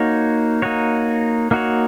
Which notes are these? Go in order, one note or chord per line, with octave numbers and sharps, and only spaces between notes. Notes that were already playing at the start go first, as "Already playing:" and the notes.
Already playing: A#3 D#4 F#4 C#5
A#3 D#4 F#4 C#5
A#3 D#4 F#4 C#5